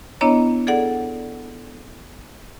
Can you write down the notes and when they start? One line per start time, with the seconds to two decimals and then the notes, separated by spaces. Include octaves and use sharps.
0.21 B3 D4 E4 C#5 D#5 A#5
0.67 G#4 A4 D5 F#5